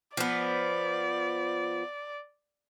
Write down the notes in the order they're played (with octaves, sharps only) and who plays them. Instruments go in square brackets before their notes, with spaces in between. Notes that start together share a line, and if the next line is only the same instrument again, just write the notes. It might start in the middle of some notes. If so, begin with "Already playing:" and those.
[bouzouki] F3 B3 [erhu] D5